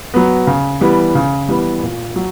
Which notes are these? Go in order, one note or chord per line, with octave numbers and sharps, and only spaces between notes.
F#3 B3
C#3
E3 G3 B3
C#3
E3 G3 B3
A#2
F#3